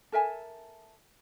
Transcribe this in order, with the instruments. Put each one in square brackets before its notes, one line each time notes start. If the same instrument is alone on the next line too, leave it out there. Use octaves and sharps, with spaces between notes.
[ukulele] A4 A#4 E5 G#5